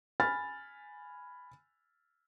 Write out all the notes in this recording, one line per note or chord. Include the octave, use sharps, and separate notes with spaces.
G#5 B5 F6 A6